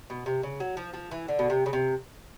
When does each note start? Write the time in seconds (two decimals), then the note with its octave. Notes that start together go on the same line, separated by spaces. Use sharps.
0.10 B2
0.26 C3
0.43 C#3
0.60 F#3
0.77 F3
0.94 F3
1.11 E3
1.28 D3
1.39 B2
1.50 C3
1.66 C#3
1.73 C3